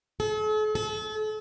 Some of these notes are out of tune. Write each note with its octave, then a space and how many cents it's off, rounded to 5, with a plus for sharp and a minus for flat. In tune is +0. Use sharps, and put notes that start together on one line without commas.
A4 -45
A4 -40